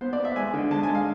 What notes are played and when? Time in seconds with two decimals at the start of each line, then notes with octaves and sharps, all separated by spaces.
0.01 B3 C5
0.13 D5
0.19 B3
0.25 E5
0.36 G#3 G#5
0.54 D3
0.71 G#3 A5
0.83 G#5
0.89 G#3
0.95 F5